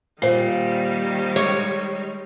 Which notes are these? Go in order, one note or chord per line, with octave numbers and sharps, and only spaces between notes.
A#2 D#3 G3 C5 C7
G#3 C#5